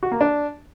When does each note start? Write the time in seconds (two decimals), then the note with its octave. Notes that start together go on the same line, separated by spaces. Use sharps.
0.03 F#4
0.12 A#3
0.21 D4